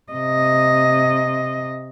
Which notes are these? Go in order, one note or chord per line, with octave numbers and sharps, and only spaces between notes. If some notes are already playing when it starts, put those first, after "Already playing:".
C3 D#5